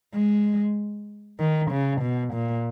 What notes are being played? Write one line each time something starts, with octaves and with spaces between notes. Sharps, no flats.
G#3
D#3
C#3
B2
A#2